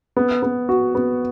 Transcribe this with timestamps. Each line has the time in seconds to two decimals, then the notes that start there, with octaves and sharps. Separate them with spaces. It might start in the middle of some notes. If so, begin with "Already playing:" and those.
0.17 B3
0.42 B3
0.69 F#4
0.95 B3